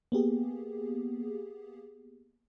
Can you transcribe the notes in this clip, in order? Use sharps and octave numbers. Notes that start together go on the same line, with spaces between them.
A#3 B3 G4 G#4